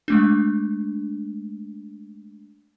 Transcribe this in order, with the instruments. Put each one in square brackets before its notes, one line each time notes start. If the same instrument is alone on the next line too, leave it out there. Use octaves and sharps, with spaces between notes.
[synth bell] G#3 A3 D4